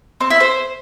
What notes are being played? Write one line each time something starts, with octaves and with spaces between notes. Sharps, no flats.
C4
E4
C5